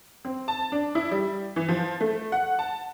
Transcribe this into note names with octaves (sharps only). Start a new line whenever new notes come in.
C4
A5
D4
E4
G3
E3
F3
A3
F#5
A5